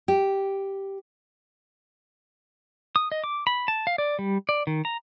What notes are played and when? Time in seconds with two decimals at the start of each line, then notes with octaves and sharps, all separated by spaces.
0.08 G4
2.96 D#6
3.12 D#5
3.24 D6
3.47 B5
3.68 A5
3.87 F5
3.98 D5
4.19 G3
4.49 D5
4.67 D#3
4.85 A#5